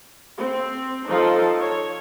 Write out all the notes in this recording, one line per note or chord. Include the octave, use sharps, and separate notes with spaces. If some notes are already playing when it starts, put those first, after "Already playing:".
C4
F3 D#4 F4 A4
C#5